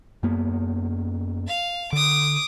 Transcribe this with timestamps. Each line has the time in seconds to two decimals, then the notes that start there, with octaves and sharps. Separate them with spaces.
0.23 F#2 A#3 B3
1.47 F5
1.93 D3 D6 D#6